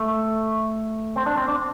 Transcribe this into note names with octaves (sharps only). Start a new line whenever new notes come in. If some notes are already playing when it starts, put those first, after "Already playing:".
Already playing: A3
C4
D4
C4
D4